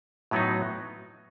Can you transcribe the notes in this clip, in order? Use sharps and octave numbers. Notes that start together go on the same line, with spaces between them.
A2 F#3 B3 D#4